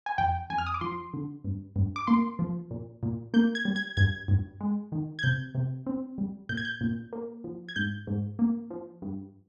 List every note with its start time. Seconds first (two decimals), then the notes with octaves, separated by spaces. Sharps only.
0.06 G#5
0.18 F2 G5
0.50 F2 G#5
0.58 F6
0.66 D#6
0.74 D6
0.81 F3 C6
1.13 D3
1.44 G2
1.76 G2
1.96 D6
2.07 A#3 C6
2.39 F3
2.71 A#2
3.03 A#2
3.34 A#3 G6
3.55 G#6
3.65 G3
3.76 G#6
3.97 G2 G#6
4.28 G2
4.61 G#3
4.92 D#3
5.19 G#6
5.23 C3 G6
5.55 C3
5.86 C4
6.18 G3
6.49 A#2 G6
6.57 G#6
6.65 G6
6.81 A#2
7.13 A#3
7.44 F3
7.69 G#6
7.76 G#2 G6
8.07 G#2
8.39 A#3
8.70 F3
9.02 G2